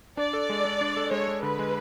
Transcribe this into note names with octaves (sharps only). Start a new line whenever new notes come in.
D4 D5
A4
G#3
G#3
D4
A4
G#3 C#5
G#3
D3 B4
G#3